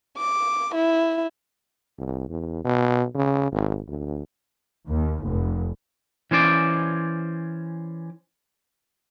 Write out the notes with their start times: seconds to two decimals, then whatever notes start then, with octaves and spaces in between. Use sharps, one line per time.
0.17 D6
0.75 E4
1.98 C2
2.29 E2
2.64 B2
3.15 C#3
3.52 G#1
3.88 D2
4.88 D#2
5.24 F1
6.31 E3 C#4 C5 D5